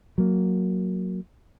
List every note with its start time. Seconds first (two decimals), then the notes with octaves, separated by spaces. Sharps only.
0.18 F#3 A#3